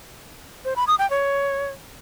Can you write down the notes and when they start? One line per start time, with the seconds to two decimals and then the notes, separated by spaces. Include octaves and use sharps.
0.65 C5
0.76 B5
0.88 D#6
0.99 G5
1.10 C#5